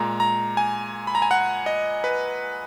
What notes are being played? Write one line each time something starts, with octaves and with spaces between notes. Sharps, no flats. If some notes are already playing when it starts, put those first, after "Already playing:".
Already playing: A#2 G#3 A#5
A#5
G#5
B5
A#5
G#5
F#5
D#5
B4